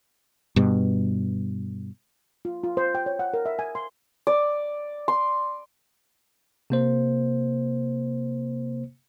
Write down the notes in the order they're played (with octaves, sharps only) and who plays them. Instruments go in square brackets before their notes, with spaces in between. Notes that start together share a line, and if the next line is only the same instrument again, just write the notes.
[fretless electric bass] G2 B2
[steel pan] F4
F4
C5
G5
C#5
F#5
A#4
E5
G#5
C6
[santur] D5
C6
[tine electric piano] C3 A#3 C5